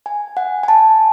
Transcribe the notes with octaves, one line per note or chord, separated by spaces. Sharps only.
G#5
F#5
G#5
A5